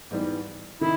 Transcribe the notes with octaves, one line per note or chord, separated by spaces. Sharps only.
G#2 E3 G3 B3
D#3 E4